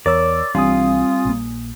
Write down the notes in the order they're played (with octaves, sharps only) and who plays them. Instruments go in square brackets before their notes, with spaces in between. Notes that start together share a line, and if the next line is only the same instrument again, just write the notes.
[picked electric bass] E2 [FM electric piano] A#4 C#5 E6 [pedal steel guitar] D5
[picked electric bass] B1 E3 D4 [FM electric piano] G3 G#5 D#6 [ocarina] C4 [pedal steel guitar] F4
[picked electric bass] A#1 A#3